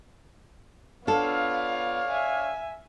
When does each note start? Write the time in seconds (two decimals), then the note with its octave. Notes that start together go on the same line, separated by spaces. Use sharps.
1.07 B3 D4 F4 A4 C#5 D5 F5
2.08 E5 G#5